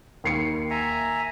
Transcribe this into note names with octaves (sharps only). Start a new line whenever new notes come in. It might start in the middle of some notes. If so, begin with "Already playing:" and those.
D#2 C7 C#7
E5 G#5 A#5